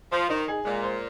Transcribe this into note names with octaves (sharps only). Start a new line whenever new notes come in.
F3 C5
D#3 D#4
G#4
A#2 G#3
C5